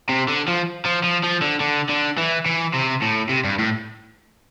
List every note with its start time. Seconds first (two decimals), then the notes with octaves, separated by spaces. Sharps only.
0.09 C3
0.28 D3
0.48 F3
0.85 F3
1.03 F3
1.23 F3
1.41 D3
1.60 D3
1.89 D3
2.18 E3
2.46 E3
2.74 C3
3.02 A2
3.29 C3
3.45 G2
3.59 A2